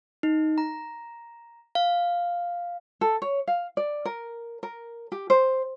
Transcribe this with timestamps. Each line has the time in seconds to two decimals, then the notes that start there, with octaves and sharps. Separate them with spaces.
0.23 D#4
0.58 A#5
1.75 F5
3.01 A4
3.22 C#5
3.48 F5
3.77 D5
4.05 A#4
4.63 A#4
5.12 G4
5.30 C5